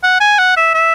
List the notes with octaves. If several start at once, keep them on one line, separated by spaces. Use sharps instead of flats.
F#5
G#5
F#5
E5
E5